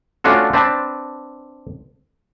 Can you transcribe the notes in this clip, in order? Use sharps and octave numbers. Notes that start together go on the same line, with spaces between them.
A3 C#4 D4 F4 F#4 A4
C4 D4 B4 A5